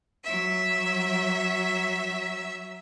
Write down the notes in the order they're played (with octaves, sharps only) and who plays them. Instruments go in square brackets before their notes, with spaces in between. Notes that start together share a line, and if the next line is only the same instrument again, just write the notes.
[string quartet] F#3 E5